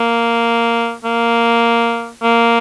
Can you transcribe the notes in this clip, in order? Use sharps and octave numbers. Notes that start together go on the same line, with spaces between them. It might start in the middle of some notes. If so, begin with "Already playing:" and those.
Already playing: A#3
A#3
A#3